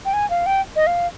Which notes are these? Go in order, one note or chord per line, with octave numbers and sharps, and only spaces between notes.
G5
G#5
F5
G5
D#5
F5